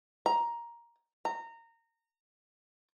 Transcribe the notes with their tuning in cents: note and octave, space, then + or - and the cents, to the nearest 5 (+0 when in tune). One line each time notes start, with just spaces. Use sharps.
A#5 +10
A#5 -20